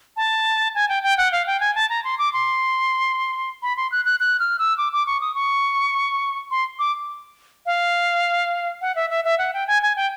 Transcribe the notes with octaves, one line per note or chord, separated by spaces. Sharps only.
A5
G#5
G5
G5
F#5
F5
G5
G#5
A5
A#5
C6
D6
C6
B5
C6
F#6
F#6
F#6
F6
E6
D6
D6
C#6
D#6
C#6
C6
D6
F5
F#5
E5
E5
E5
F#5
G5
G#5
G#5
G5